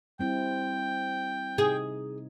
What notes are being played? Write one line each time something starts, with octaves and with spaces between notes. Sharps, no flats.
G3 C4 E4 G5
C3 D#4 G#4